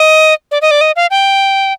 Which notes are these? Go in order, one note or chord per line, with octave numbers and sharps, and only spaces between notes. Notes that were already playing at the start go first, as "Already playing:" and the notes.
Already playing: D#5
D5
D#5
D5
D#5
F5
G5